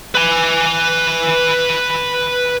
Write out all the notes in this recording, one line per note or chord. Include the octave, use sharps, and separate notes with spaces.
B4 G#5